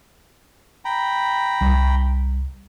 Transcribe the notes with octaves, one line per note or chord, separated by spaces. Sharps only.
G5 A#5 B5
C2 G3